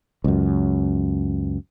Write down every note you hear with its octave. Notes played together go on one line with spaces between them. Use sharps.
C#2 F#2